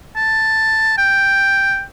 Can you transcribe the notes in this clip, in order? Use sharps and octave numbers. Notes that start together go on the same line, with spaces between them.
A5
G5